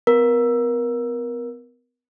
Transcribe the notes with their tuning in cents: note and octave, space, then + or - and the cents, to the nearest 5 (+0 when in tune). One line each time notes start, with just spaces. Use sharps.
B3 +40 A#4 +20